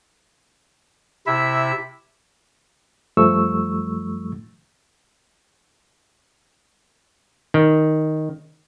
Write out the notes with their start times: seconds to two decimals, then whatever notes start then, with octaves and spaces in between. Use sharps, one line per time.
1.27 C3 E4 E5
3.17 F#2 F3 G3 A3 C#6 E6
7.54 D#3